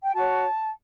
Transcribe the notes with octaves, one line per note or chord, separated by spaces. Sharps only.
G5
F#4 C#5 A5